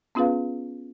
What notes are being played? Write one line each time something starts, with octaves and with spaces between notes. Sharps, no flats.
B3 C#4 F4 G#4 B4 F5